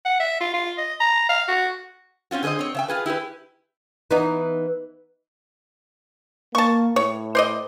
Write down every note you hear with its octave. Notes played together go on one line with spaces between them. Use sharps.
F#5
E5
F4
F4
D#5
A#5
F5
F#4
C4 C#4 F4 F#4
D3 G#4 B4 C5 D#5
C4 C#5
C#3 E5 G5
F4 G#4 B4
E4 G4 G#4 B4
E3 B3 D#4
A#3 A5 C#6
A2 C#5
C5 D5 D#5